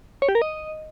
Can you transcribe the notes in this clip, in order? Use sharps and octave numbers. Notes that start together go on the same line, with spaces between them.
C#5
G4
A#4
D#5